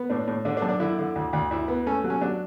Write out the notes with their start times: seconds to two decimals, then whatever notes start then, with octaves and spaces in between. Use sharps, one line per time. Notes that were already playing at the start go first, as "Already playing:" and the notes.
Already playing: B3
0.10 A2 D4
0.28 A2
0.45 D3 D4
0.57 D4
0.62 F#2
0.69 D4
0.80 D3 E4
0.99 D3
1.16 D2
1.33 D2
1.51 D2 E4
1.68 B3
1.86 A3 C#4
2.04 F#3
2.10 C#4
2.21 F#3 D4